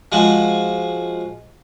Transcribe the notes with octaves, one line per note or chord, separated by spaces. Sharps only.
F3 G#3 F#4